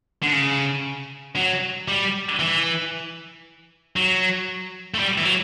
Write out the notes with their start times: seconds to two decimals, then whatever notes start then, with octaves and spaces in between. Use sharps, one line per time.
0.23 D3
0.33 C#3
1.36 F#3
1.88 G3
2.39 E3
3.96 F#3
4.94 A3
4.99 G3
5.18 E3
5.25 F#3